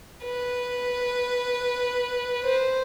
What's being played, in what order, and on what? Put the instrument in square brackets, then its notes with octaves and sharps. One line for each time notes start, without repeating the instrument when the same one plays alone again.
[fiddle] B4
C5